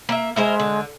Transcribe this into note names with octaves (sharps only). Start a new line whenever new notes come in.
A#3 E5
G#3 E4 A#4 C5
D3